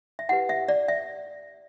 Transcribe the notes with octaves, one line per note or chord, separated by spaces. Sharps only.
E5
E4 G4 B4 F#5
E5
D5
E5